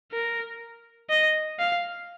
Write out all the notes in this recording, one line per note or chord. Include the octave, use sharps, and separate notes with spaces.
A#4
D#5
F5